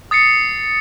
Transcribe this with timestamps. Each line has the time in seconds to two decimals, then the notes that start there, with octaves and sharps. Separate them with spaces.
0.11 D#6 A6 C7 C#7